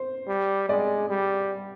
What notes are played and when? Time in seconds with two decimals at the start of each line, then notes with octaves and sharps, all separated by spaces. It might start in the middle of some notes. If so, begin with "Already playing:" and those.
Already playing: C5
0.27 G3
0.69 G#3 D5
1.09 G3